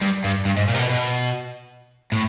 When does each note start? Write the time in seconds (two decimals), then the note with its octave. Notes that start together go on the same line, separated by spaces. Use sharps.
0.01 G2
0.24 G2
0.45 G2
0.57 G#2
0.68 A#2
0.74 C3
0.79 B2
0.90 B2
2.12 A2